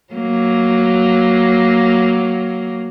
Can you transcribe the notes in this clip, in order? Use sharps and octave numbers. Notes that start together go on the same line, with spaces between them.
F#3 A#3